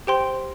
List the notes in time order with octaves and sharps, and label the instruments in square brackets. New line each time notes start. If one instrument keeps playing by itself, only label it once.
[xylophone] G4 C5 G5 C6